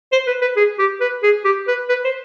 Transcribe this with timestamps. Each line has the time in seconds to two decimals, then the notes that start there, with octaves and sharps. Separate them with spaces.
0.12 C5
0.27 B4
0.41 B4
0.57 G#4
0.79 G4
1.01 B4
1.23 G#4
1.44 G4
1.68 B4
1.89 B4
2.04 C5